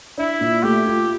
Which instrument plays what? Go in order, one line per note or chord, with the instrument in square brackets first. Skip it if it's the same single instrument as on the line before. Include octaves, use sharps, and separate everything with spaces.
[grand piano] D4 [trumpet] E4
[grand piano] A#2
[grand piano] A3 [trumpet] G4
[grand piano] F4